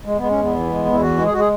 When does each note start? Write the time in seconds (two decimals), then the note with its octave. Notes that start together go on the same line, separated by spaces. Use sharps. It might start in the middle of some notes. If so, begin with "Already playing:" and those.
0.06 G#3
0.18 G#3 B3
0.30 C#4
0.38 E2 B3
0.54 E3
0.70 G#3
0.85 E2
0.93 E4
1.02 E3 F#4
1.18 G#3
1.26 G#4
1.33 G#3 F#4
1.40 G#4